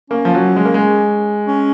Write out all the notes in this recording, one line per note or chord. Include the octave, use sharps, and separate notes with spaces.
A#3 C#4
F3
F#3
G#3
A#3
G#3
C#4